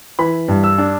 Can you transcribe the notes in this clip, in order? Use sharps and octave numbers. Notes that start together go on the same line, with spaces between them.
E3 B5
G2
E6
D4